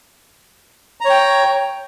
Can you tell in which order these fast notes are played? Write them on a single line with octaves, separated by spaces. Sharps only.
A#5 C#5 G5